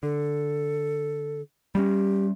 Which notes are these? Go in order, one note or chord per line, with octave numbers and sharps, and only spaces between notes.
D3 A4
G3 A#3 C#4 G4